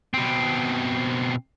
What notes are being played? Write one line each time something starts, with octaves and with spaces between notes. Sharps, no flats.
B2 C4